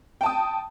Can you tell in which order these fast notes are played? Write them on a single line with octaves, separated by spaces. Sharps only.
G5 A5 D#6